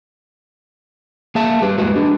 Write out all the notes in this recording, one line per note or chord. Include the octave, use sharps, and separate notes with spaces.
A#3 G#4 E5 A5
G3 G4 B4
G#3 F#4 B4 D#5
D3 D4 G#4